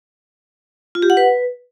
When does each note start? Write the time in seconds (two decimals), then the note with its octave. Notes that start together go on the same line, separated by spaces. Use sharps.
0.95 F4
1.02 G4
1.10 F#5
1.17 B4